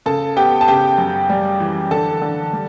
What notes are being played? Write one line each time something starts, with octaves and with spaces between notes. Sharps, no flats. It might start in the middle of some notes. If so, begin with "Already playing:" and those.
C#3 A4 A5
B3 G4 G5
A5
C#3 G4 G5
F#2
G3
E3
D3 A4 A5
D3
G3